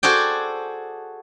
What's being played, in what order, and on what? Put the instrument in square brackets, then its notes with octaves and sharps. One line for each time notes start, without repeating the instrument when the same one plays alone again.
[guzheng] F#4 G#4 A4 C5 D5 G5